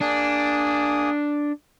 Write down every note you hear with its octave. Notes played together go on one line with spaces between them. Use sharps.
A#3 D4 G#4 D#6